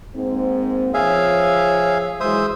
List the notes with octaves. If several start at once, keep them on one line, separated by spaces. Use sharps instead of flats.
G#2 A#3 C4
F3 G#4 C#5 E5 F5
E3 F#3 G#3 C5 E5 D#6